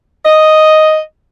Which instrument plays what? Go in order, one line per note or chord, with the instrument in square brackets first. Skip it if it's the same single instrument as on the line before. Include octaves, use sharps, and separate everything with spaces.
[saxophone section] D#5